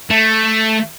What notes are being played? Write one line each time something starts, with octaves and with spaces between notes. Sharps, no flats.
A3